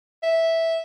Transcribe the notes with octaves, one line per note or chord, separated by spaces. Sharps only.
E5